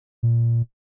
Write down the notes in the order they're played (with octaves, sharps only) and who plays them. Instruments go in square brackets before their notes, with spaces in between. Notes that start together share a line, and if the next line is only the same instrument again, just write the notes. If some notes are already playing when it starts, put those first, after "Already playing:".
[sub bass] A#2